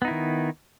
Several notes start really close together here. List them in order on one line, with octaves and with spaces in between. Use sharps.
B3 D#4 E4 D#3